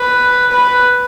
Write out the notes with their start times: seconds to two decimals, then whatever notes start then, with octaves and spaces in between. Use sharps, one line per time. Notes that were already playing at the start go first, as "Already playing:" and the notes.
Already playing: B4
0.52 B4